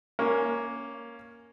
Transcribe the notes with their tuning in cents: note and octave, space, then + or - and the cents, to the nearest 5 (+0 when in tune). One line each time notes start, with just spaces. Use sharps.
A#3 +0 C#4 +0